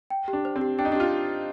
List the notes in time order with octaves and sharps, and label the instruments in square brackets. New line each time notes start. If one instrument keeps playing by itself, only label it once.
[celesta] G5
G4
[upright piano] D4
[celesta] C5
[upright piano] C4
[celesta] G4
[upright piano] D4 [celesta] G5
[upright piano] D#4
D4
[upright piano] F4 [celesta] G4